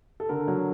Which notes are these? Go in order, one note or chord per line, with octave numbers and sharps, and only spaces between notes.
A4
D3 A#4
F#3